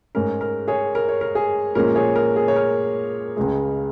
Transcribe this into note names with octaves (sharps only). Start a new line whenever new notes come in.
G#2 G#3 C#4 A#4
A#4
G#4 C#5
A#4
C#5
A#4
G#4
A#2 F3 G#3 C#4 A#4
G#4 C#5
A#4
G#4
C#5
A#4
C#2 C#3 G#3